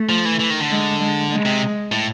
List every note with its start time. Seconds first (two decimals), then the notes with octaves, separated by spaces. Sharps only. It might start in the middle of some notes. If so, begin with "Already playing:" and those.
Already playing: A3
0.09 F3
0.25 E3
0.40 E3
0.50 D#3
0.60 D3
0.70 G#3
1.00 G#3
1.31 G#3
1.45 C3
1.92 A2